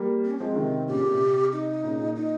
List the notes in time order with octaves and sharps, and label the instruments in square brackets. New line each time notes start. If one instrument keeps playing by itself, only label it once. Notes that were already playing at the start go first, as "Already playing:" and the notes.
Already playing: [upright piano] G3 A#3
[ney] C4
C#4
[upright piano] F3 G#3 [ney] C4
[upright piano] C3 D#3
[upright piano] A#2 C#3 [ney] G4
[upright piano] A#2
C3
C3
[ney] D#4
[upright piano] A#2 C#3
A#2
[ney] D#4